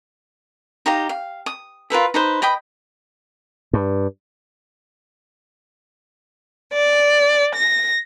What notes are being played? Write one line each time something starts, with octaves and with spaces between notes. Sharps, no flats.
D#4 G4 F5 A#5
F5
D#6
F4 A#4 B4 E5
D#4 B4 C5
D#5 G5 B5 D#6
G2
D5
A#6